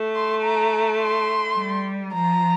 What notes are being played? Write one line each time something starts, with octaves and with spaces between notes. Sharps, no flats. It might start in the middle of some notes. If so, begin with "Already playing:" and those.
Already playing: A3
C6
A#5
C6
G3
F3 A#5